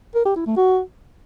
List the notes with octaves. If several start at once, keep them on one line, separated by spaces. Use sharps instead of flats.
A#4
G4
E4
A3
F#4